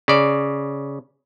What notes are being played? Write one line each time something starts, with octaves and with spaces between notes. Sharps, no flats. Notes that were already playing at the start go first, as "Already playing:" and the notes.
C#3 D5